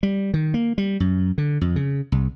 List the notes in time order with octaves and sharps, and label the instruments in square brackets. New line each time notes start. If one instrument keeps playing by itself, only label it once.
[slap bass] G3
D#3
A#3
G3
F#2
D3
F2
C#3
C2